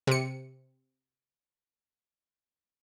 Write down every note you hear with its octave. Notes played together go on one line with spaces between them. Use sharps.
C3 C#7